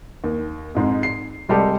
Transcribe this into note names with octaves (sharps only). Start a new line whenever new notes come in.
D#2
F2 G#2 G#3
C7
C2 G3 G#3 G4 A4